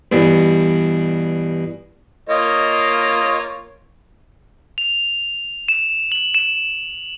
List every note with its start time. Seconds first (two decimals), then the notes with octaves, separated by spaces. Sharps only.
0.12 G2 B2 E3
2.29 A#3 F4 C#5 D#5
4.78 F7
5.68 E7
6.12 F#7
6.34 E7